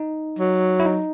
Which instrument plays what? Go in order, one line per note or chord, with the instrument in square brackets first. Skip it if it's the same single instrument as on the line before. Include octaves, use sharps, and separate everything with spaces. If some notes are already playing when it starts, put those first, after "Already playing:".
Already playing: [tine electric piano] D#4
[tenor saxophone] F#3
[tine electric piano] E4
D#4